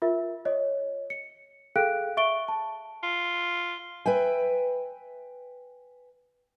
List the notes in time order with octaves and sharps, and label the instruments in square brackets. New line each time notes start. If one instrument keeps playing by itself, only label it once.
[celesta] F4 A#4 E5
C#5 D#5
C#7
G#4 A4 F5 G5 F#6 D7
E5 C#6 D7 G7
A5
[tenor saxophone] F4
[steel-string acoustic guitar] B4 E5 G5 G#5